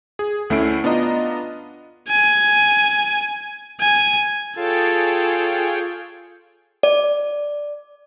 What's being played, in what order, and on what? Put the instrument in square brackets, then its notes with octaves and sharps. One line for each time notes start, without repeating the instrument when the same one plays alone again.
[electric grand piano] G#4
D2 A3 C#4 E4 C7 D7
B3 D4 F4 D#5 A#5
[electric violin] G#5
G#5
[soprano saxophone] F4 [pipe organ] G#4 C#5 G5 [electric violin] A4
[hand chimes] D5